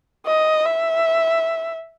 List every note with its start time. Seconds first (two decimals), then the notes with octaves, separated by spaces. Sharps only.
0.27 D#5
0.65 E5